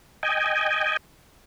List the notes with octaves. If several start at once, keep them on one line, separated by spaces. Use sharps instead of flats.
D#5 G5 G#5